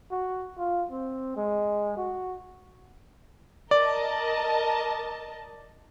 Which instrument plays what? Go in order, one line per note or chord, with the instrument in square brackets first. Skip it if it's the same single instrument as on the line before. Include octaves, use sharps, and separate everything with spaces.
[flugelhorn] F#4
F4
C4
G#3
F#4
[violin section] A#4 D#5 A5 [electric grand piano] D5